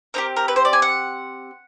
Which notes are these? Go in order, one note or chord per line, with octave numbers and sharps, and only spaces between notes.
C4 D#4 G4 A#4
A#4
B4
C5
D5
G#5
F#5